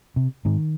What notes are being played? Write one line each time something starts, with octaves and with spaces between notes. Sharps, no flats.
C3
G#2 D#3